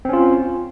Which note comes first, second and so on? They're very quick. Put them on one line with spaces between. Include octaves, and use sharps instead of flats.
C4 C#4 F4